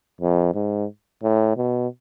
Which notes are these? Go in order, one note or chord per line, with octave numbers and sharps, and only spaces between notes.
F2
G#2
A2
B2